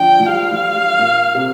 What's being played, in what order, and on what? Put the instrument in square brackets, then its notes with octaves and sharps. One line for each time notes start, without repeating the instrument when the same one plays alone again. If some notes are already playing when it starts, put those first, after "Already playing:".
Already playing: [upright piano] D3 F3 D4 [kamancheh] G5
[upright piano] F3
[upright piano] G3 [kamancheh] F5
[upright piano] F3
G3
A#2 A#3
C3 C4